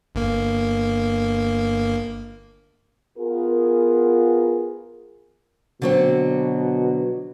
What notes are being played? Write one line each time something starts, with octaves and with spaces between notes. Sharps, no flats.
G1 A#3
B3 F4 G#4 A#4
B2 D3 F#3 C4